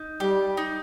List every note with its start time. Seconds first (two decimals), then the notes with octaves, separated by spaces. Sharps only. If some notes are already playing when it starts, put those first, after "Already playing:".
Already playing: D#4
0.20 G3 G4
0.57 D#4